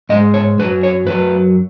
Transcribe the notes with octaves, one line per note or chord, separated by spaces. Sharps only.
G#2 G#3 D#5
C#5
F#2 F#3 B4
C#5
F#2 F#3 B4